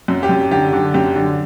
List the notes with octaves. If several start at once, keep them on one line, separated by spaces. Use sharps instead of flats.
F#2
G4
F#2
D3 G4
D3
F#2 G4
D3